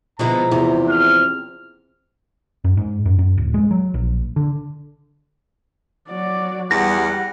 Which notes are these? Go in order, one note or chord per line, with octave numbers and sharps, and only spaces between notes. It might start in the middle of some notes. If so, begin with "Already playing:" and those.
B2 D3 F3 G#3 B3 E4 A#5
E2 C3
F6
F#2
G#2
F#2
F#2
D1
G#3
F#3
A#1
D3
F#3 D5
E2 G3 F#5 A#6